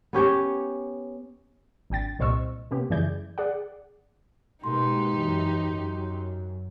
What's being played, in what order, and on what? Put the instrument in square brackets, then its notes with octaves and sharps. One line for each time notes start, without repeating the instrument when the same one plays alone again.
[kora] B3 C#4 G4 C#5
[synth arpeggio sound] G#1 D4 G5 A6
C2 A#2 C5 D#5 C#6 E6
C3 A#3 B3 C#4 G4
F#2 C#3 E3 G#4 D5 G6
G#4 D5 F#5
[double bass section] B2 G#3 A#3 [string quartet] D#4 G4 [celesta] C6
[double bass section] F#2 E3
F#2